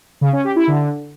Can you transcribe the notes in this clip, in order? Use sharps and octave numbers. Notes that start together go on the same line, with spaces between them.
C#3
C#4
G4
E4
D3